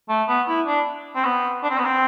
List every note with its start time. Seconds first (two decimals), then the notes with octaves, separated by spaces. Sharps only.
0.09 A3
0.28 B3
0.48 E4
0.67 D4
1.15 C4
1.24 B3
1.63 D4
1.70 C4
1.78 B3
1.85 C4